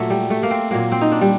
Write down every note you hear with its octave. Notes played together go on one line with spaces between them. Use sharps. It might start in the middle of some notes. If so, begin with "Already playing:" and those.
Already playing: A#2 F#3 A3
G3
A3
A#3
C4
A#2 F#3 A#3
C4
D#4
D4
G3